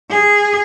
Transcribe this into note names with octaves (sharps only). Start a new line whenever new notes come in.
G#4